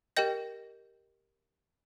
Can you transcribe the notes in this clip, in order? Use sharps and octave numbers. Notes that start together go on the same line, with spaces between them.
G4 A#4 D#5 G5 G6 A#6